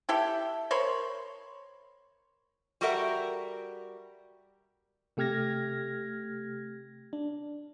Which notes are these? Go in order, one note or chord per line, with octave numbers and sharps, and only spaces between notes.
E4 G4 A4 G5
A#4 C5 C#5 B5
G3 F#4 A4 A#4 E5 F#5
C3 A3 G4 F6 G#6 A#6
D4